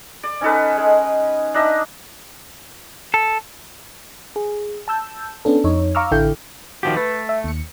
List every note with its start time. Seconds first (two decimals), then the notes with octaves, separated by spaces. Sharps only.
0.23 D5
0.41 C#4 D#4 A4 B4
0.77 G#3
1.54 D4 D#4 D#5 E5
3.14 A4
4.36 G#4
4.88 A5 E6 G6
5.45 B3 C#4 D4 A4
5.64 F2 D#4 C#5
5.95 F5 A#5 C#6 D6 E6 F6
6.11 A1 D3 E4 A4 G5 G6
6.83 D#3 F3 F#4 G4
6.97 A3 B4
7.29 E5
7.44 D#2 C#7